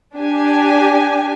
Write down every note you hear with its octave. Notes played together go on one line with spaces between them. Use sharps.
D4 G4 G#5